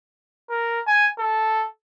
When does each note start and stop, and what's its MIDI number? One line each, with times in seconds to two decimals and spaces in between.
0.50 0.80 70
0.87 1.07 80
1.19 1.66 69